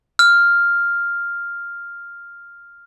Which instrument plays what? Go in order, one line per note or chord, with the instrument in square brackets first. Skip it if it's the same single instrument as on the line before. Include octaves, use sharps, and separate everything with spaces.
[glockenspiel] F6